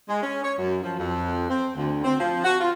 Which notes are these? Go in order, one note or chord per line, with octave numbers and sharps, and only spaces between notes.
G#3
C#4
C#5
F#2
F3
F2
C4
D2
C4
F3
F#4
F4